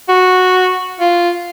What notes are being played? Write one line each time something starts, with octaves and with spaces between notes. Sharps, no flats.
F#4
F4